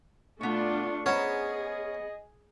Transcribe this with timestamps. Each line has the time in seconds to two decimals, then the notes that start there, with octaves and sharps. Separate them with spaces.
0.41 B2 A3 B3 D4 F4 C#6
1.06 B3 C#4 G#4 C5 D#5 A#5